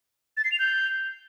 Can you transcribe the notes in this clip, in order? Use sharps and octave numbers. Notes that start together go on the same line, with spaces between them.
A6
C7
F7
G6